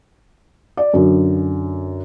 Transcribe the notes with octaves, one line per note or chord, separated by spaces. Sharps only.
D5
F#2 D3